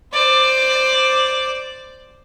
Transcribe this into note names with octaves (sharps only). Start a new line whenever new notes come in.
C5 D5